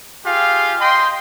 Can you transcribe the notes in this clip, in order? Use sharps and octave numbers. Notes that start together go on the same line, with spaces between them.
F4 G4 G#4 F5
D#5 G5 C6